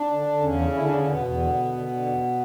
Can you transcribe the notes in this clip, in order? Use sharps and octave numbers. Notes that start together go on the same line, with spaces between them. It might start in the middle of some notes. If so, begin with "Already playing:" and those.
Already playing: D4
D3
D3
E2 C#3 C#4
D3
D3 E4
D4
D3
C#4
E2 B2 B3
E2
D3
D3
D3
D3
E2